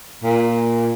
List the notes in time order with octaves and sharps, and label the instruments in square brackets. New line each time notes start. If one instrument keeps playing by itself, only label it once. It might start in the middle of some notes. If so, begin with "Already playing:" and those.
[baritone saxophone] A#2